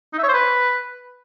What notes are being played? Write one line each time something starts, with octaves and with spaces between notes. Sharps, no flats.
D#4
E5
C#5
C5
B4